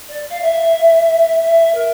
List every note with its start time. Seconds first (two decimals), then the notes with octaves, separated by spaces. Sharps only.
0.08 D5
0.30 F5
0.42 E5
1.41 E5
1.74 A#4